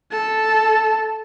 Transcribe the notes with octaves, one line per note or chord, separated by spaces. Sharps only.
A4 A5